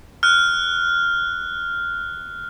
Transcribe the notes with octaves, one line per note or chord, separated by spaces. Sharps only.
F6 F#6